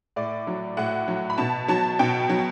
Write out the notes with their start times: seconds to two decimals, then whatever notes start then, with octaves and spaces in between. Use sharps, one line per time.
0.16 A2 D5
0.47 F#3
0.77 A2 F#5
1.08 F#3
1.30 B5
1.38 B2 A5
1.68 F#3 A5
1.99 B2 G5
2.29 F#3